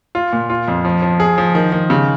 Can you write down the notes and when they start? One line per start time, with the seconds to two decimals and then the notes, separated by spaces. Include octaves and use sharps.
0.15 F4
0.33 A#2
0.50 F4
0.68 F2
0.85 F3
1.02 F3
1.20 G#4
1.38 F3
1.55 D#3
1.72 D#3
1.90 C#3